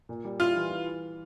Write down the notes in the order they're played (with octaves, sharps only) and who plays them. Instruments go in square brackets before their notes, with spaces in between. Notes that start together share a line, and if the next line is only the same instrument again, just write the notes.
[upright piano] A#2
G3
[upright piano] E4 [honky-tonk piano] F4
[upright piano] E3
E3